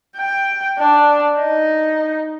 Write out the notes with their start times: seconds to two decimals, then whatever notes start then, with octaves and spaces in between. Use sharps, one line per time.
0.17 G5
0.78 D4
1.38 D#4